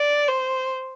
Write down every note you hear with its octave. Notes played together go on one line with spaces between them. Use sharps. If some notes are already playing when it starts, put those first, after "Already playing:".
Already playing: D5
C5